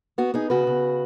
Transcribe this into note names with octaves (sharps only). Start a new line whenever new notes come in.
B3 F#4
B3 D#4 G#4
C#3 F#4 B4
C#3